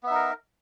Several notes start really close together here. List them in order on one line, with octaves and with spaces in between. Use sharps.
B3 E5 D#4 A#4